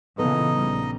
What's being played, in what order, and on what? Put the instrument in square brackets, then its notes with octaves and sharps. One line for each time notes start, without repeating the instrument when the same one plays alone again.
[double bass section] A#2 C#3 E3 [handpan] B3 A4 B4 [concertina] D#4 D#5
[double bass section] A#1 G3